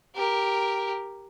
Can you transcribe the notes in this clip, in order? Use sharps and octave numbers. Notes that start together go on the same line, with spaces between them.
G4 A#4